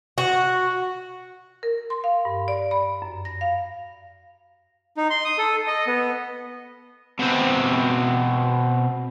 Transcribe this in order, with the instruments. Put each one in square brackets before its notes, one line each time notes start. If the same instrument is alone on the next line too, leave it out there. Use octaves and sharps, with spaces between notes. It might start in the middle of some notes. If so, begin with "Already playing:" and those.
[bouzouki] F#4
[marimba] A#4
C6
F5
G2
D5
B5
F#2
A#6
F5
[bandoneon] D#4
C6
D#6
A4
D#5
B3
[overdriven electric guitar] B2 C4